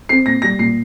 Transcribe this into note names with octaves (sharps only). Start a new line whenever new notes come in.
C4 C7
A#2 A#6
G3 A#6
A#2 C7